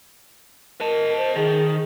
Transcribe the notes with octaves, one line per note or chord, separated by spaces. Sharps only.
A#4 D#5 A5
C5
D#3 G#4